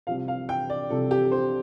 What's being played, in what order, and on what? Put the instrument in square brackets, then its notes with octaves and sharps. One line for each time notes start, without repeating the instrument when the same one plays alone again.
[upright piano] C2 C3 F3 F5
F5
G5
D5
C2 C3 F3 A4
G4
C5